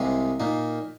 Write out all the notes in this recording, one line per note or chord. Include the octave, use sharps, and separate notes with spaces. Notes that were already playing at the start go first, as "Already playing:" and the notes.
Already playing: C2 C3 G#3 F5 A#5
A#2 A#3 D#4